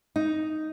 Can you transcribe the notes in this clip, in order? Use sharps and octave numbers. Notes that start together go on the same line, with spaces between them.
D#4